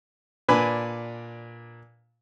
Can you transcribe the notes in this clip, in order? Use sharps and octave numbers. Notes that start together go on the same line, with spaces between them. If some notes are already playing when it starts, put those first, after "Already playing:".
A#2 D4 B4 G#5